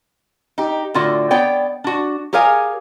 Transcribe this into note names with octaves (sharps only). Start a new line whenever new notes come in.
D#4 G4
A2 D3 F4 F#4 D5
B3 C#5 D5 G5
D4 F#4
G4 G#4 A#4 C#5 F5 G#5